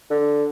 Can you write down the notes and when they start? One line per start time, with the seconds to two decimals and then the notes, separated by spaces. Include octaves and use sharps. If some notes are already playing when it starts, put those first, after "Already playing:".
0.10 D3